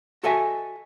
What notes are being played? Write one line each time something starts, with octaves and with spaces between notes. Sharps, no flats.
F#4 A4 D#5 E5 G#5